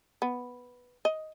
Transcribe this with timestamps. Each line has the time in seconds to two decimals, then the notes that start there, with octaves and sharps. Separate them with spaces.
0.22 B3
1.05 D#5